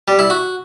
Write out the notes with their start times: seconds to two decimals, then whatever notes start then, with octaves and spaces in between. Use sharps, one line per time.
0.08 G3
0.19 E4
0.30 F#4